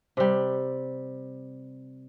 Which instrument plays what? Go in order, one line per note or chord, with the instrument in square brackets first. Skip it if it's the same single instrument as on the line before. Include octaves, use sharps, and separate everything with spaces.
[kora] C3 G3